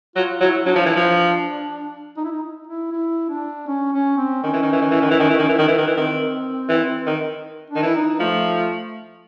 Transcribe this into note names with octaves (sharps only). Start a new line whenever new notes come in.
F#3 F4
F#3 E4
F#3 D4
F3
E3
F3
D#4
E4
D#4
E4
E4
D4
C#4
C#4
C4
D#3 C#4
E3
D#3
E3
D#3
E3
D#3
E3
D#3
E3
D#3
E3
D#3
E3
D#3
E3
D#3 C4
E3
D#3
D4
D#3
E3 E4
D#4
F3 A3